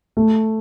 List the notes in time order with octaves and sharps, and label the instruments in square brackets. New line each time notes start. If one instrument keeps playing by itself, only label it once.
[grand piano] A3